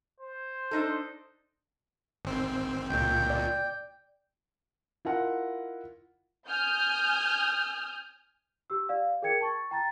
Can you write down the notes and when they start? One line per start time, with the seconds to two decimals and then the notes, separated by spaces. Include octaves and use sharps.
0.20 C5
0.71 D4 D#4 A4
2.25 G#1 C4
2.89 C#2 A#2 G5 G6
3.30 D5
5.05 E4 F4 A#4 F#5
6.47 G#5 D#6 F6 G6
8.70 G4 E6
8.89 D5 F5
9.22 G#4 A#4 G5 G#6 C#7
9.41 A5 C#6 A6
9.71 G5 A#5 A6